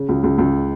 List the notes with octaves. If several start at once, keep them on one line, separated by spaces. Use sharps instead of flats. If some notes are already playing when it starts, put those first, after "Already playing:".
Already playing: C#3
C#2
C#2
C#2